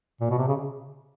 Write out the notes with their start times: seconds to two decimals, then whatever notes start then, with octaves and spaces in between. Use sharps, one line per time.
0.21 A#2
0.30 B2
0.39 C3
0.48 C#3